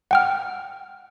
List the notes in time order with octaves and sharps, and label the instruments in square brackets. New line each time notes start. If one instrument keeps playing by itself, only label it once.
[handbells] F#5 G5 F6